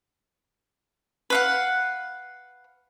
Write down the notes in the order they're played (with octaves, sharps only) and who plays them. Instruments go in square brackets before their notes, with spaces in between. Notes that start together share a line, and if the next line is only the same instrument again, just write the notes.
[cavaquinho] B4 F5 F#5